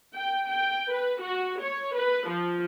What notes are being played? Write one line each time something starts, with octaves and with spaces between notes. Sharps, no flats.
G5
G5
B4
F#4
C#5
B4
F3